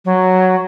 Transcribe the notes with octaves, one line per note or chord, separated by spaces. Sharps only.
F#3